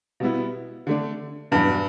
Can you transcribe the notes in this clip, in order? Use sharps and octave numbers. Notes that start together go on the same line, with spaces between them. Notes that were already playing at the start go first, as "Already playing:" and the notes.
B2 G3 B3 E4
D3 A3 D4
E2 G2 B2 F#3